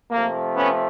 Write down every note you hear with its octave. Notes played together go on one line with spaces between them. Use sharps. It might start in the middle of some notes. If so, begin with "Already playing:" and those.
C3 F3 A3 A#3
B3 C#4